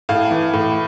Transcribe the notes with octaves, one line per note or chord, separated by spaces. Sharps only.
A2 F5
E3
A2